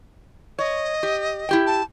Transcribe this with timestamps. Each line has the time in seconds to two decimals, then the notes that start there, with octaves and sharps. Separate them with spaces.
0.59 C#5 D#5
1.03 G4
1.49 E4 G4 G5
1.67 A5